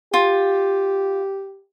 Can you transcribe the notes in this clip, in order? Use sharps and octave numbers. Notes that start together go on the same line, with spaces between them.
F4 G4